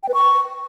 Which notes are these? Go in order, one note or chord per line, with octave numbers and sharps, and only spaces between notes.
G5
B4
C#6